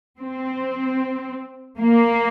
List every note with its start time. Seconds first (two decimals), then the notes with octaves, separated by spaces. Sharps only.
0.19 C4
1.78 A#3